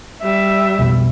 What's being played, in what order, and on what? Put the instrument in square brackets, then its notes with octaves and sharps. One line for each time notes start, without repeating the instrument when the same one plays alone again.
[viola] G3 [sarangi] E5
[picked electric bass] B1 F2 B2